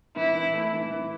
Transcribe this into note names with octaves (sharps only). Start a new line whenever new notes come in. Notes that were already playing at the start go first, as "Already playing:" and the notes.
E3 E4
E3
A3
E3
E3